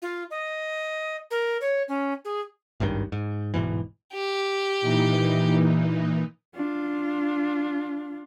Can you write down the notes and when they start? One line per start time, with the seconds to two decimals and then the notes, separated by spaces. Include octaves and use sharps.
0.02 F4
0.31 D#5
1.31 A#4
1.61 C#5
1.88 C#4
2.25 G#4
2.80 G#1 C#2 G2 D#3
3.12 G#2
3.54 D1 G#2 B2 E3
4.13 G4
4.81 A#2 E3 D#4
6.55 D4 F4